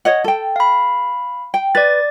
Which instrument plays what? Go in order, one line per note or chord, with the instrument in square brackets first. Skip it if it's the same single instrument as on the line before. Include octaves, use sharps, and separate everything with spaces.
[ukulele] C#5 D#5 F#5
A4 G5
[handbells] F5 B5
[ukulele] G5
[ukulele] B4 [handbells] D5 A6